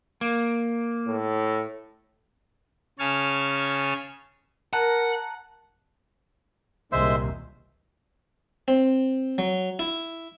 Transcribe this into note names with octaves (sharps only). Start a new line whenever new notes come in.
A#3
A2
C#3 C#5 G#5 A5 F6
A#4 F#5 A5 A#5 F#6
C2 A#2 D#3 G#3 C5 E5
C4
F#3
E4